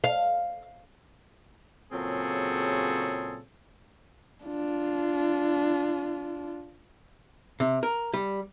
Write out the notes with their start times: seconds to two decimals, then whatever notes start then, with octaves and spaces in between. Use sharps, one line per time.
0.04 F5
1.92 A#2 C#3 F#3 C4 G#4 A4
4.45 D4 F4
7.60 C3
7.83 A#4
8.14 G3